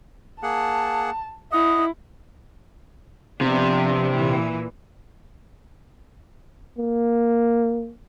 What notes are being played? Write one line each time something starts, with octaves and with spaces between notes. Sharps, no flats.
A#3 G#4 F#5 A5
E4 D#5 F#5 D#6
C3 F3 B3 D4
A#2 E3
A#3